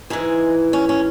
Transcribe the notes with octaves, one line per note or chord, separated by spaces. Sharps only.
G#2 E3 G#3
C#4
C#4